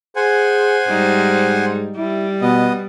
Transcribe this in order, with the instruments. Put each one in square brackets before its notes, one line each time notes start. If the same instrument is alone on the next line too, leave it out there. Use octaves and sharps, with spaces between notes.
[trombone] G#4 [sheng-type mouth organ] C5 F#5 G#5
[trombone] G#2 [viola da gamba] G3 D#4
[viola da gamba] G3 [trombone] E4
[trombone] B2 [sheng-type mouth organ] B3 D#5